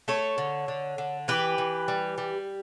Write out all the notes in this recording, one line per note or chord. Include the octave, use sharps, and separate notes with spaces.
A3 A4 C#5
D3
D3
D3
E3 G4 B4
E3
G3
G3